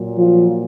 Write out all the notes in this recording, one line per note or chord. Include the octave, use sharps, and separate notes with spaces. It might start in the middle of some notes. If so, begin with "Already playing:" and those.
Already playing: A#2 F#3
F3 F4